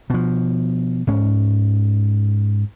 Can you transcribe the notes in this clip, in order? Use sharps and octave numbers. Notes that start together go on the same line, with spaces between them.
B2 F3
G#2 C#4